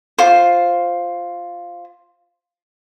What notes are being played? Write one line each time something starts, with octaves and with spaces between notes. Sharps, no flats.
F4 C5